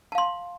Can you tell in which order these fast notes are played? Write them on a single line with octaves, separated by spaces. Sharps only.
A5 F5 C6